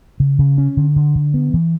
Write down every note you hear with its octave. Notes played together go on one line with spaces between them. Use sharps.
C#3
C#3
C#4
D3
D3
D3
B3
E3